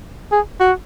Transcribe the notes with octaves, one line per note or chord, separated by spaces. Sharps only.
G#4
F#4